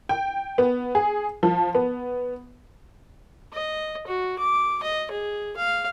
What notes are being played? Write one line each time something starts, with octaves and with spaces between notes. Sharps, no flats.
G5
B3
G#4
F3
B3
D#5
F#4
D6
D#5
G#4
F5